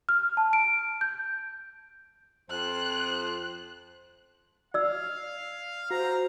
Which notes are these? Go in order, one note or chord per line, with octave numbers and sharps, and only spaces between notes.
F6
A5
D7
G6
F2 C5 F#6
D5 F5 E6
F#4 C5 A#5